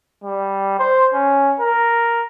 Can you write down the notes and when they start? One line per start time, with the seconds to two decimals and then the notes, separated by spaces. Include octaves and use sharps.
0.24 G3
0.79 C5
1.13 C#4
1.60 A#4